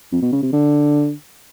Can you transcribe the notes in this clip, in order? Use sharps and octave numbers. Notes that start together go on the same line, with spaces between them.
F2
B2
C#3
C3
D3